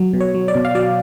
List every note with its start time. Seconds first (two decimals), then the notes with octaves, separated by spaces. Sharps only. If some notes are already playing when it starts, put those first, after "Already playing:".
Already playing: F#3
0.13 B2
0.20 C#5
0.34 F#3
0.48 D5
0.55 B2
0.65 F5
0.75 F#3 D5